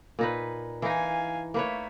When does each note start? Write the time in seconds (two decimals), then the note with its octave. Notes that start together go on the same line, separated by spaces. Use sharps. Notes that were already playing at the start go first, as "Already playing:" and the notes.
0.19 A#2 D#4 B4
0.82 E3 D#4 F5 G#5
1.54 A3 A#3 B4 C#5